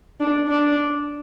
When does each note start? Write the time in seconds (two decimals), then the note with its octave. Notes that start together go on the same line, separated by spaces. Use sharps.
0.20 D4
0.48 D4